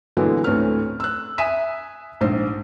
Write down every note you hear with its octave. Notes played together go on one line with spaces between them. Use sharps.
A#2 D3 E3 F#3 G#3 B3
D2 A2 C4 C#4 B4 F6
E6 F#6
E5 G#5 D#6 B6 D#7 E7
A#1 G#2 C5